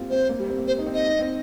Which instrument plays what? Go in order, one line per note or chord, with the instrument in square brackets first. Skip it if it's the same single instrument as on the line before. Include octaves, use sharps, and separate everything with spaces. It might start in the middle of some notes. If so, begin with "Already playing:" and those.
Already playing: [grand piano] G3 A#3 C4 F4
[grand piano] C4 [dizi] C5
[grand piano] A#3
G3
C4
A#3
[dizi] C5
[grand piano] D#4
C4
[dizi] D#5
[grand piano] D#4
C4